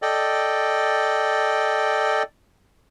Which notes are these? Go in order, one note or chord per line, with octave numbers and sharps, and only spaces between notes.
A4 D5 D#5 G5